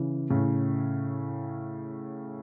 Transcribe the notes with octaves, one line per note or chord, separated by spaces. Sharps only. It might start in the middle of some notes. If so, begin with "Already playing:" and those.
Already playing: C#3 E3
A2 C#3